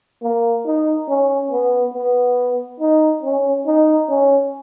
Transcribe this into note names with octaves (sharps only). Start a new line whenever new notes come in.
A#3
D#4
C#4
B3
B3
D#4
C#4
D#4
C#4